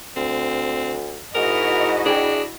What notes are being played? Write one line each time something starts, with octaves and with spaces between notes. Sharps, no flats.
D2 C4
G#2 E4 F#4 A#4 D#5
D4 G#4 G5